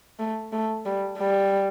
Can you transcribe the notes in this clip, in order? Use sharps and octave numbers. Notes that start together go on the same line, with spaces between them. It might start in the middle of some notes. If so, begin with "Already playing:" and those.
A3
A3
G3
G3